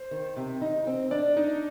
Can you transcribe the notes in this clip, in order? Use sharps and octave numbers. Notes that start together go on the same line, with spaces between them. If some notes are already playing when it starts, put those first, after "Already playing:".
Already playing: C5
D#3
C3
D#4
C4
D4 D5
D4 D#4